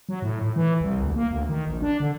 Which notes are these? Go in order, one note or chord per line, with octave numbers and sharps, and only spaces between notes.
F#3
A2
A2
E3
C2
D2
A#3
D2
D#3
A#1
D4
D3